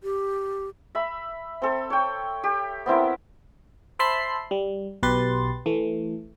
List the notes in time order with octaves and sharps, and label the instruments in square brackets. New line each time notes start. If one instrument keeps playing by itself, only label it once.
[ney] G4
[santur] E5 B5
C4 A4
C#5 G5
G4
B3 C4 E4 A#4
[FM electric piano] C5 E5 A5 B5 C6 C7
G3
B1 B2 G4 B4 C6 A6
E3 A3